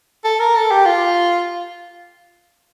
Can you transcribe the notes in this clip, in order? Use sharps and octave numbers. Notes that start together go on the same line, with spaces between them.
A4
A#4
A4
G4
F4